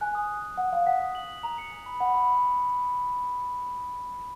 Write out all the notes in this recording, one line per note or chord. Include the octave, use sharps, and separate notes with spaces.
G#5 F#6
D#6
F#6
F#6
F#5 G#5
F5 G#5
F#5 B6
D#6
F#7
F#7
A#5 F7
C#7
G#5
B5
F#5 B5
B5